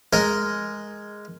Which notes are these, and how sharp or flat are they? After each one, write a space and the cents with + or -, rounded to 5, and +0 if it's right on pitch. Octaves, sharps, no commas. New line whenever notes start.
G#3 +0 A#4 +0